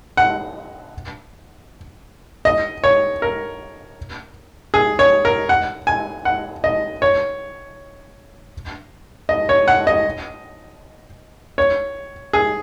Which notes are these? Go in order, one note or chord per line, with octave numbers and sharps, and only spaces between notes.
F#5
D#5
C#5
A#4
G#4
C#5
A#4
F#5
G#5
F#5
D#5
C#5
D#5
C#5
F#5
D#5
C#5
G#4